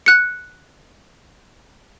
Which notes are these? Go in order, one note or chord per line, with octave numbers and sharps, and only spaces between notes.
F#6 C#7